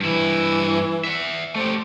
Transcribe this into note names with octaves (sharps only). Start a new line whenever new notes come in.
G2 E3 E4
E5 F#5
A3 G4 C5